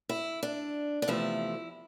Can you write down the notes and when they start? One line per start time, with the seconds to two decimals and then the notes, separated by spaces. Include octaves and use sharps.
0.09 E4
0.43 D4
1.02 D4
1.08 E2 C3 F3 A3 E4